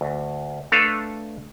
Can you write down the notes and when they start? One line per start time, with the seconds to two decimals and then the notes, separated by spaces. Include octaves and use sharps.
0.01 D2
0.72 A3 D4 A4 B4 F5